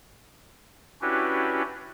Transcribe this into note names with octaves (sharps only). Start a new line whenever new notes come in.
C#4 D4 E4 F#4 G4 B4